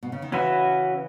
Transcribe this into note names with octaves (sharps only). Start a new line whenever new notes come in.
B2
C#3
D#3
C#3 E3 C#4 F#4 B4 E5